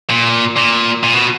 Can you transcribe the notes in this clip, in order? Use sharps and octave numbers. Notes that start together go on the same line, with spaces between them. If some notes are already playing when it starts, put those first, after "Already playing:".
A#2
A#2
A#2
B2